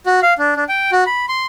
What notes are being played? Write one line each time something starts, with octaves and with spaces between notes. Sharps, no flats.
F#4
F5
D4
D4
G5
F#4
B5
C6